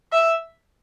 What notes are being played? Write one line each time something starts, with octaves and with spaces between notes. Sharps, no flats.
E5